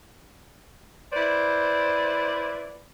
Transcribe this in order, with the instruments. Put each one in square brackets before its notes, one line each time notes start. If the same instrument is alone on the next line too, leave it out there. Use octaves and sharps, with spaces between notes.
[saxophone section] E4 B4 C5 D5